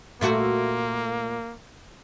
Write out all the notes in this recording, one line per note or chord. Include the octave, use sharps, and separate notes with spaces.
A#2 A3 A#3 F#4